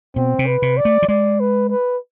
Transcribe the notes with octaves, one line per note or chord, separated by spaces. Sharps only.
B2 C4
C3
B4
C3
D5
A3
F3
G#3 D5
B4
B4